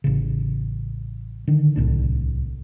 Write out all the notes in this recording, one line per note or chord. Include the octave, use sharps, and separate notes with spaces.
A1 C#3
D3 D#3
D1 C2 A2 D4